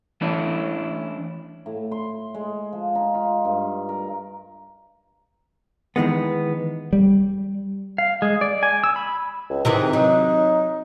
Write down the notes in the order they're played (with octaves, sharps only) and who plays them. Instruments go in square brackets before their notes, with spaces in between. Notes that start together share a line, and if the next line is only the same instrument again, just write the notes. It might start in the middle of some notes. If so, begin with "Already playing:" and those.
[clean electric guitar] E3 A3 C#4 D4 E4
[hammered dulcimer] A2
C6
G#3
F3
D#4
F4
G2
A#4
[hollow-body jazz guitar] D#3 E3 G#3 B3
[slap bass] G3
[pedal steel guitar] F5
G#3
D5
G#5
E6
B5
[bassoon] C#2
[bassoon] G#2 [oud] C3 D#3 E3
[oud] F#3 [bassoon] D#4